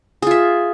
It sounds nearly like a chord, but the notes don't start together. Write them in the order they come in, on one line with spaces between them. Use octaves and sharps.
G#4 F4 E5